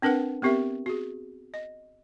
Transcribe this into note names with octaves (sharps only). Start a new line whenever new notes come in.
C4 D4 A#4 B4 F#5
B3 C4 G4 A#4 E5
F#4 G#4
D#5